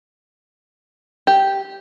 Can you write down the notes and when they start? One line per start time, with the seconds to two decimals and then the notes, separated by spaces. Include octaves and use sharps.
1.27 G4